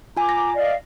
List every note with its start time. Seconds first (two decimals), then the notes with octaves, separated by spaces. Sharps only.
0.17 F4 G#5 A#5 D6
0.29 A#6
0.55 D5 D#5 F5